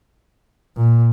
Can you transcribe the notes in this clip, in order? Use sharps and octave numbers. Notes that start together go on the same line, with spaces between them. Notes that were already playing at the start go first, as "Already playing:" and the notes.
A#2